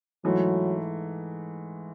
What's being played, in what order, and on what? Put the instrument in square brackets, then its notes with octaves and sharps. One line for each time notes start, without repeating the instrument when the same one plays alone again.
[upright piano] G#2 E3 A3 [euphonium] F#3